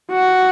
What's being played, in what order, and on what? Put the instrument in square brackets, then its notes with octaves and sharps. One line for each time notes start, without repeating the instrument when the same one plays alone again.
[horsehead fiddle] F#4